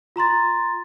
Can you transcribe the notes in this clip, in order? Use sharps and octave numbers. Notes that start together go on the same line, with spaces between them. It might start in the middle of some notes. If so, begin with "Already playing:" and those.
F4 A#5 C6 A6